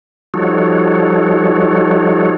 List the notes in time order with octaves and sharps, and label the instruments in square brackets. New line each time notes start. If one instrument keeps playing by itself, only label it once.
[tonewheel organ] F3 G3 D#4 F#4 A4 C#5